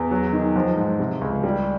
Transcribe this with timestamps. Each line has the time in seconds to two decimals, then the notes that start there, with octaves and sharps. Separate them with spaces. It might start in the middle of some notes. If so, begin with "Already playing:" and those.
Already playing: E2
0.11 F#3
0.32 D#3
0.56 F3
0.77 G#2
0.99 C3
1.21 C#2
1.44 G3